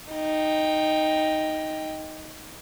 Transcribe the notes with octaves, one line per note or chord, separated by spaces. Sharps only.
D#4 G5